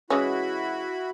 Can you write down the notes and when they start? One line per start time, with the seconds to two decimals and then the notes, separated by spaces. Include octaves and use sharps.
0.10 E3 G#3 C#4 E4 F#4 B5